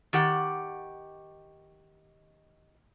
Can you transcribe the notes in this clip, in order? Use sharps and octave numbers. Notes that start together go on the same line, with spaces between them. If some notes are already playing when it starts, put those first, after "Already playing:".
D#3 G4 F#5